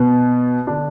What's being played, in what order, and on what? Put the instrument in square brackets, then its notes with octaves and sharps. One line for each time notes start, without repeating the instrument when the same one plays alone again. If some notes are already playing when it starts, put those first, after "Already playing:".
Already playing: [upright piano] B2 B3
D3 D4